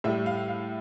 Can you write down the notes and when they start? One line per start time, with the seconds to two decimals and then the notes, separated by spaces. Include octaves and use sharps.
0.04 A2 E5
0.07 G3
0.26 F5
0.48 F5